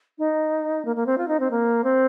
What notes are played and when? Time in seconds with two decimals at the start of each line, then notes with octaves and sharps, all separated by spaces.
0.18 D#4
0.85 A#3
0.96 A#3
1.06 C4
1.18 F4
1.28 D#4
1.40 C4
1.51 A#3
1.84 C4